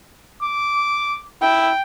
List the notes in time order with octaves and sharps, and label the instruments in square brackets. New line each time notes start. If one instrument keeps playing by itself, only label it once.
[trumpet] D6
[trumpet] E4 [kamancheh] G5